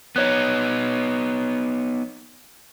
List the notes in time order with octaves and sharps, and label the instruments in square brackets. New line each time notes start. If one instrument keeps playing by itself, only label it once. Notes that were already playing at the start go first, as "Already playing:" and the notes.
[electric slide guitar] B3 D#4 [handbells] C#5 F#6